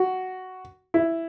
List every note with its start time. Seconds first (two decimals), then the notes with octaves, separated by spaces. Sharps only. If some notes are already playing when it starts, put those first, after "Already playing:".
Already playing: F#4
0.94 E4